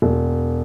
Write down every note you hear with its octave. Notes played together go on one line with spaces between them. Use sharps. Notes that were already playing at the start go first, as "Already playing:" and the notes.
E1